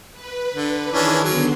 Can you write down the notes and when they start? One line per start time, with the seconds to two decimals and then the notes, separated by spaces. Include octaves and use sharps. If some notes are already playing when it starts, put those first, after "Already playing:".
0.13 B4
0.54 D3
0.92 D#3 E3 C#4 D4 G#4 A#4
1.24 D3 F#3 B3 C6